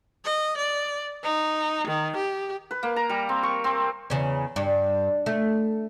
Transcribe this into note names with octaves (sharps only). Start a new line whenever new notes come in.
D#5
D5
D#4
D#3
G4
B4
A#3
A#5
G3
C4
C#6
C4
E2 C#3 C#4
G2
A3